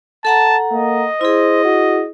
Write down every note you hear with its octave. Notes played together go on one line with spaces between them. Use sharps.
A4 F#5 A5 A#5
A#3 D#5
E4 G#4 C5
F#4